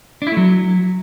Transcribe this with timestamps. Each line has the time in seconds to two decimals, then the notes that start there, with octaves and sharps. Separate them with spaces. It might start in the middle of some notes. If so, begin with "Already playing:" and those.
0.22 D4
0.27 E4
0.32 A3
0.37 F#3